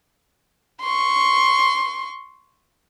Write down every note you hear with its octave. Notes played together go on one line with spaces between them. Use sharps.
C6 C#6